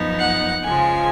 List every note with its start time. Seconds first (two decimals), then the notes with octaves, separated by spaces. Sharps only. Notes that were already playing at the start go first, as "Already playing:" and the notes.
Already playing: F#2 F3 B3 D#4
0.18 F#5
0.64 C#3 F3 G#3 G#5